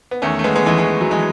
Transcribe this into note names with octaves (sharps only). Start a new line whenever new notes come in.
B3
E2 D#3 A3 C#4
A3
G#3 B3
G#3 B3
E3 G#3
E3 G#3
F#3
E3 G#3